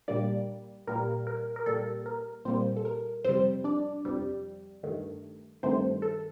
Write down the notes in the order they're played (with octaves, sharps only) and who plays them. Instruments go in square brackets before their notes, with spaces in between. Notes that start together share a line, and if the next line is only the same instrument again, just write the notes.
[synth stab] A#2 G3 A#3 D4 D5
A#2 G3 A#3 A#4
A#4
A#4
A#2 G3 A#3 A4
A#4
A#2 G3 A#3 C4 C5
A4
A#4
F2 C3 G3 C4 C5
D4 D5
F2 C3 G3
G2 D#3 A3
G2 D#3 A3 C4 C5
A4